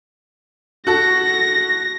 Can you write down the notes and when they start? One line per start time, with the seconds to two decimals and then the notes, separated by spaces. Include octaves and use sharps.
0.87 F#4 A4 A#6